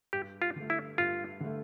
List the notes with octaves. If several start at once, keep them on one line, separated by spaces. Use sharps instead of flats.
G2 G4
F4
D3 A3
E4
G2 F4
D3 A3